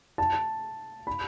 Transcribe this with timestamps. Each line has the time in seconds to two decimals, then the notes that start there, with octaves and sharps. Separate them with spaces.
0.18 A5
1.07 B5